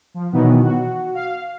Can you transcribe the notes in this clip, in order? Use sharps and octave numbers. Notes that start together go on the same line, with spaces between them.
F3
B2 D#3 E3 F#3 B3
F#4
F5